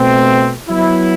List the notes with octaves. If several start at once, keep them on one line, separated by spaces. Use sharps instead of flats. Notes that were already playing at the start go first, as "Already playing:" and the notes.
Already playing: B2 A3 C4
F#3 B3 E4